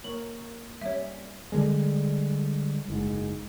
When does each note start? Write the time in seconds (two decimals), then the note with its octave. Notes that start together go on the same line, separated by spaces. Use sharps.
0.04 A#3 A#4 C#5 F#7
0.81 G3 C#4 C#5 E5
1.52 D3 G3 G#3
2.88 F#1 G#2